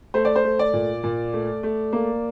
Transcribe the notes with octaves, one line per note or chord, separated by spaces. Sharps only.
A3 C5
D5
C5
A3
D5
A#2
A#2
A3
A3
A#3